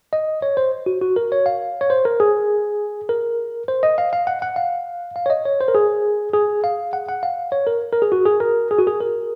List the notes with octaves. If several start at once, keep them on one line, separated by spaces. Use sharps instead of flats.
D#5
C#5
C5
F#4
F#4
A#4
C#5
F5
C#5
C5
A#4
G#4
A#4
C5
D#5
F5
F5
F#5
F#5
F5
F5
C#5
D#5
C#5
C5
A#4
G#4
G#4
F5
F#5
F#5
F5
C#5
A#4
A#4
G#4
F#4
G#4
A#4
G#4
F#4
G#4
A#4